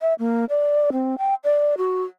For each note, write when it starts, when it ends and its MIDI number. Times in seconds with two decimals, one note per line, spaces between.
0.02 0.14 76
0.19 0.45 58
0.49 0.90 74
0.92 1.15 60
1.18 1.34 79
1.44 1.74 74
1.78 2.04 66